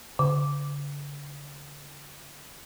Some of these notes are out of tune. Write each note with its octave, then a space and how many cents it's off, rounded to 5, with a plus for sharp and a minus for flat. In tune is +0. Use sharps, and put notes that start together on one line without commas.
D3 -45